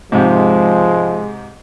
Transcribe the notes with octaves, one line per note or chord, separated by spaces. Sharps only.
G#2 C3 F3 G#3